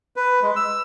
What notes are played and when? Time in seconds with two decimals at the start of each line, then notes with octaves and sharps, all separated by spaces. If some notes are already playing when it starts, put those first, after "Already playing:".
0.16 B4
0.42 G#3
0.56 E6